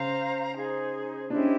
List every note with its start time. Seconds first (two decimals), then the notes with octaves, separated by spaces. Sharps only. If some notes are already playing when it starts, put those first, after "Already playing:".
Already playing: C#3 C#4 C5 F5 A#5
0.54 D#4 G#4 C5
1.30 D4 E4 G4 C5 D#5
1.38 C#4